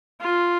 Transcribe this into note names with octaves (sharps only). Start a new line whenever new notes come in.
F4